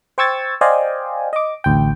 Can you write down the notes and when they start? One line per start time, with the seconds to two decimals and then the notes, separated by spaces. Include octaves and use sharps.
0.18 C5 G5 C#6 E6 G#6 A6
0.61 C5 D5 D#5 F5 G5 G#5
1.33 D#5 D6
1.64 A1 D2 G5